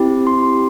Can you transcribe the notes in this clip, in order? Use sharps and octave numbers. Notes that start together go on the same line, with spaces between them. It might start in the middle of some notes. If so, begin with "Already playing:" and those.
Already playing: C4 E4 G4
C6